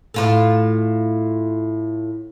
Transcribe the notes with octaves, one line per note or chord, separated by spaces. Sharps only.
A2 F4 A4